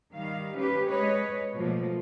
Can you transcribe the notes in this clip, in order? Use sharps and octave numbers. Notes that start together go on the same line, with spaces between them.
D#3 G3 F5
C#4 G4 B4
G#3 B4 C#5 D#5
B2 F3 A3 A#3